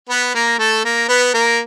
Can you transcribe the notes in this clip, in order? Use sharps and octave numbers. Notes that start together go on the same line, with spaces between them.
B3 B4
A#3 A#4
A3 A4
A#3 A#4
B3 B4
A#3 A#4